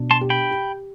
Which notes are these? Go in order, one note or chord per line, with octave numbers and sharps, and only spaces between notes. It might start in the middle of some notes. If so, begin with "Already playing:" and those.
Already playing: B2 D4
A5 C6
G4
G5 B5
G4